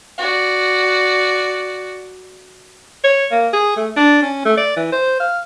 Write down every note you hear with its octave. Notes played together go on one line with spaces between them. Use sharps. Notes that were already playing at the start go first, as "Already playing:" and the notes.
F#4 D5
C#5
A#3
G#4
A3
D4
C#4
A3
D5
E3
C5
F5